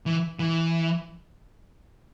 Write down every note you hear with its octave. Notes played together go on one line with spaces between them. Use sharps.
E3
E3